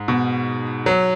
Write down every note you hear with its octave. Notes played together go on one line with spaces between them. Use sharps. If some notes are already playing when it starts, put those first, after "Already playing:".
Already playing: G#2
B2
F#3